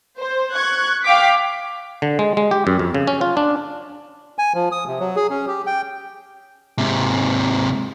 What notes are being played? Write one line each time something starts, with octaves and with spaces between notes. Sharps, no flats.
C5
C#6 F#6 G#6
F5 G5 D6 B6
D3
G#3
G#3
G4
F#2
F2
C#3
C#4
F4
D4
G#5
F3
D#6
C3
F#3
G#4
C#4
G4
G5
G#2 C3